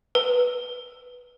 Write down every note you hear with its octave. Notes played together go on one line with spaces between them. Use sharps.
B4